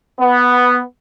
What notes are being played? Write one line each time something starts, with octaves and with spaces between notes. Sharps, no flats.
B3